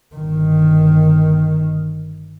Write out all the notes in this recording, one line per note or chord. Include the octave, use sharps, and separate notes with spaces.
G1 D#3